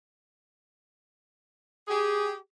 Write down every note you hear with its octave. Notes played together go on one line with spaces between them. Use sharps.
G4 G#4